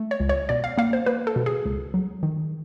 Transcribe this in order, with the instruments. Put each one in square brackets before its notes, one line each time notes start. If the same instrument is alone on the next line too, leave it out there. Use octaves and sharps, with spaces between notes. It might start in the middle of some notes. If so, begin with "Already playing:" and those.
Already playing: [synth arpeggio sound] A3
C#5
C#2
C#5
B2 D5
F5
A#3 F5
C5
A#3 B4
A4
B2
G#4
C#2
F#3
D#3